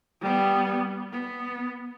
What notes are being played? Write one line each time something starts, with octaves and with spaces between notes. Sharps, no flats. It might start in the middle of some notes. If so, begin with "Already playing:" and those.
G3 B3
B3